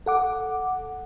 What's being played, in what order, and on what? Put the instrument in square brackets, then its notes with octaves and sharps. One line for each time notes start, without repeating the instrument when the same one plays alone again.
[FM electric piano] A4 F#5 D6